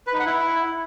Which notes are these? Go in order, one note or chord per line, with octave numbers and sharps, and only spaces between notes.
B4
D#4
F#5
E4